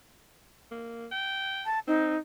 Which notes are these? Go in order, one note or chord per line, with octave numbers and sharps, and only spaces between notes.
A#3
G5
A5
C4 D#4